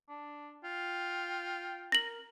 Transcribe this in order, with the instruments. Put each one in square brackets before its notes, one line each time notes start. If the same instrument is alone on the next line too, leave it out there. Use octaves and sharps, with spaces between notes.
[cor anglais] D4
[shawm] F4 [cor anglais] G5
[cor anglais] A#4 [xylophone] A#6 F#7